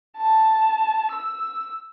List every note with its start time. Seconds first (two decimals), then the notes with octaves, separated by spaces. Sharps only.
0.17 A5
1.12 E6